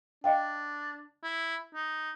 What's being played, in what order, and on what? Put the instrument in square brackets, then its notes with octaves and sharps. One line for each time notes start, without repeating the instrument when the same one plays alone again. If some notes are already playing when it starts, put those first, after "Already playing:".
[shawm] D4 [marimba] D#5 F5 G5
[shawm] E4
D#4